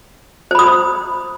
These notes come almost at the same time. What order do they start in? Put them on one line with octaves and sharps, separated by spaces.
C5 B5 D#6